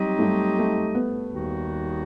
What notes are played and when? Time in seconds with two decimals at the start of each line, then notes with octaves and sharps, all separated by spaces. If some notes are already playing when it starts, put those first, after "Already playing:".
Already playing: F#3 G3 C4 D#4 G4 D#5
0.19 A3
0.22 G3
0.59 A3
0.95 B3
1.31 D#2 D#3 G3 D#4 F#4